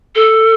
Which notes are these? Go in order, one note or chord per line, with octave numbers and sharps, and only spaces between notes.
A4